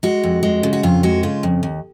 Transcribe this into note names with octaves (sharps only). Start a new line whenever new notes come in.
G#3 F#4
F2
G#3
C#3
F#4
F2 F4
G#3 F#4
C#3 F4
F2
D#2